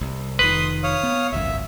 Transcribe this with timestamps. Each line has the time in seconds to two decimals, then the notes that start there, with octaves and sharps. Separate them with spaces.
0.01 C2
0.39 F1 D#3 B4 C6 D#6
0.83 C#5 F5 D#6
1.03 B3
1.32 G#1 C#2 F#2 E5